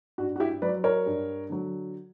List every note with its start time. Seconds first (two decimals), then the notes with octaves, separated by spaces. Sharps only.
0.18 G2 F#4
0.36 F#4
0.40 E4 G4
0.62 F#3 B4 D5
0.84 A#4 C#5
1.06 G2
1.50 D3 F#3